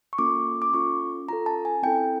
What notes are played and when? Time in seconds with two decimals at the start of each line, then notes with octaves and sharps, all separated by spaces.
0.13 C#6
0.18 A#3 C#4 F4 A4 D6
0.62 D6
0.73 C#4 F4 A4 C#6
1.29 C#4 F4 A4 A#5
1.46 A5
1.65 G#5
1.83 C4 E4 A4 G5